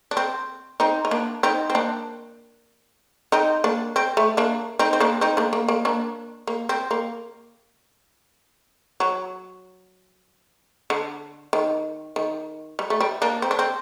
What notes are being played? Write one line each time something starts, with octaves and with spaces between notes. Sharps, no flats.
D4
C4
C4 D#4
D#4
A#3 D4
C4 D#4
C4
A#3 D4
C4 D#4
A#3 D4
C4
A3
A#3 D4
C4 D#4
C4
A#3 D4
C4 D#4
A#3 D4
A#3
A#3
A#3 D4
A#3
C4
A#3
F#3
D3
D#3
D#3
G3
A3
G3
A#3 D4
C4
D4
C4